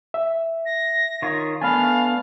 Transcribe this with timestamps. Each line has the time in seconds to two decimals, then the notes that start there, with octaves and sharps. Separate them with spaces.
0.14 E5
0.66 A#6
1.22 D#3 F4 C#5
1.61 A3 B3 D4 F5 G#5 B5